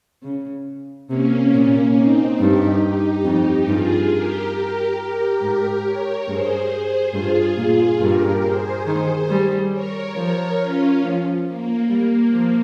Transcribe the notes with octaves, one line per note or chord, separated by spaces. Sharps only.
C#3
C3 A#3 C#4
A#2
C4 D#4
G2 D#4 G4
D#4 G4
F2
G2 F4 G#4
G4 A#4
G4 A#4
G4 A#4
G#2
A#4 C#5
G2 G#4 C5
G2 F4 G#4
A#2 F4 G#4
G2 G4 A#4
G#4 C5
D#3
G3
A#4 C#5
F3 A#4 C#5
C#4 F4
F3
A#3
G3
F3